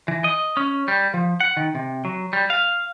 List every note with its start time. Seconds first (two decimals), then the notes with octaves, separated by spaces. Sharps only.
0.08 E3
0.24 D#5
0.57 C#4
0.88 G3
1.14 F3
1.40 F#5
1.57 D#3
1.75 C3
2.05 F#3
2.33 G3
2.50 F5